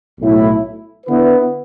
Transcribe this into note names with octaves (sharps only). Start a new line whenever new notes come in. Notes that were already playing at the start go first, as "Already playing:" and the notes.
B1 A2 A3 E4
D3 B3 E4 B4